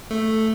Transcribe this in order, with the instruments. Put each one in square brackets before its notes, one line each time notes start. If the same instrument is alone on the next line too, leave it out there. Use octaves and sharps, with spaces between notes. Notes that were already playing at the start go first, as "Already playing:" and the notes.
[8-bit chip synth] A3